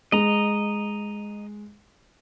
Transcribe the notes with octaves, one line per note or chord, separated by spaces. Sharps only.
G#3 D#5 A#5